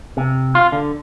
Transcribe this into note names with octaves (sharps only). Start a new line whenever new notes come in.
C3
F4
D3